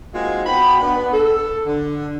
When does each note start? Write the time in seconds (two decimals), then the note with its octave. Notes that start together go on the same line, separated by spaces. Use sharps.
0.13 G#3 A#3 C4 D#4 F4 F#4
0.46 B3 F#4 G5 B5
0.81 B3 D4
1.13 A4
1.66 D3